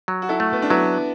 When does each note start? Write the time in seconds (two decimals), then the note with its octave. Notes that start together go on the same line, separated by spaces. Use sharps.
0.08 F#3
0.22 F#4
0.29 E4 A4
0.40 A3
0.53 B3
0.62 D4
0.70 F#3 B3 E4